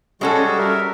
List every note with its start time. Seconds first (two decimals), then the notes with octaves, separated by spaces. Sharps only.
0.21 G3 G#3 C#4 F#4 A4
0.59 A#4 E5